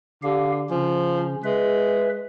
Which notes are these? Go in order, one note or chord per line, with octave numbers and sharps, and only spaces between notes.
D3 G4 F5
C#3 F3 C#4
G#3 B4 E5